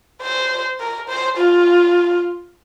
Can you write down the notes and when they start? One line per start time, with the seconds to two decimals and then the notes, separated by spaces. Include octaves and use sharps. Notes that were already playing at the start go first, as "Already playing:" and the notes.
0.22 C5
0.80 A#4
1.09 C5
1.37 F4